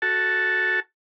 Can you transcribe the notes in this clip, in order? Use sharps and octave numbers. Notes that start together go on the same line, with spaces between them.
F#4 A4 A5